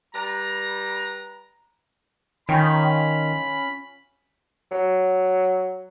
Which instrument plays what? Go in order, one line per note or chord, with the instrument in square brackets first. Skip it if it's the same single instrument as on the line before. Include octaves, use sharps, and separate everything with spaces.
[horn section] G3 B4 A#5
[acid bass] D#3 [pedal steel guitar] C#4 F4 C#5 [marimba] G5 G#5 G6 [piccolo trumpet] B5
[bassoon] F#3